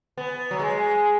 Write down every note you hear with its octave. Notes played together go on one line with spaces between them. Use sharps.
B3
F#3
G#3